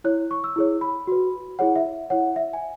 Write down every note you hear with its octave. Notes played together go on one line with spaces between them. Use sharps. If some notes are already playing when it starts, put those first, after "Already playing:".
E4 C#5 F#6
C#6
E6
E4 G#4 C#5
B5
F#4 B4
E4 G#4 C#5 F#5
E5
E4 C#5 F#5
E5
G#5